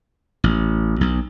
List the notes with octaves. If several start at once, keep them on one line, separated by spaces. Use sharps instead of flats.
A1
B1